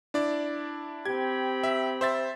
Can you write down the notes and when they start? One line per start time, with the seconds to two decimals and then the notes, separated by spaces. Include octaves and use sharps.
0.14 D4 E4 D5
1.05 C4 G4 B5 G#6
1.63 E5
2.01 C5 E5 A6